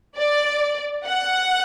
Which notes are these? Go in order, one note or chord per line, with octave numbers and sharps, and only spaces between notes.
D5
F#5